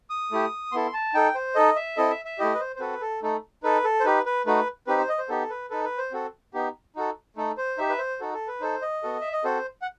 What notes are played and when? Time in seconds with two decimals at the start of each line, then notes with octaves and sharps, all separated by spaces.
0.10 D#6
0.31 A3 E4 G4
0.72 B3 E4 A4 C6
0.94 A5
1.14 D#4 A4 G5
1.35 C5
1.55 D#4 A4 D#5
1.76 E5
1.97 C4 E4 A4 D#5
2.10 E5
2.25 E5
2.39 A3 E4 G4 D#5
2.55 B4
2.60 C5
2.76 C5
2.80 C4 F#4 A4 B4
3.01 A4
3.22 A3 D#4 A4
3.63 D#4 A4 B4
3.84 A4
4.00 C5
4.04 D#4 G4 B4
4.26 B4
4.46 A3 D#4 F#4 B4
4.87 C4 D#4 G4 B4
4.98 C5
5.09 D#5
5.18 C5
5.29 B3 D#4 G4 A4
5.50 B4
5.70 D#4 A4 B4
5.85 B4
5.98 C5
6.12 C4 F#4 A4
6.54 B3 D#4 G4
6.96 D#4 F#4 A4
7.36 A3 D#4 A4
7.57 C5
7.78 D#4 G4 E5
7.89 B4
7.99 C5
8.20 D#4 F#4 A4
8.33 A4
8.48 B4
8.61 D#4 A4 C5
8.82 D#5
9.03 B3 F#4 A4
9.21 E5
9.32 D#5
9.44 C4 F#4 A4 C5
9.82 F#5